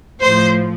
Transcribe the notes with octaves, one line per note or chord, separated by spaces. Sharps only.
A2 F3 C5